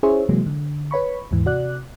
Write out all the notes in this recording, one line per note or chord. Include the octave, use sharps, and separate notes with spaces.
C#4 E4 G#4 C5 C#5 E5
C3 E3 F#3 G#3 A#3
D3
B4 C#5 B5 C#6
D#2 G#2 E3
C3 F#4 D5 F#6